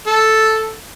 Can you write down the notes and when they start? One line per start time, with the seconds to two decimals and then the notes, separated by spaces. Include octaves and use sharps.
0.07 A4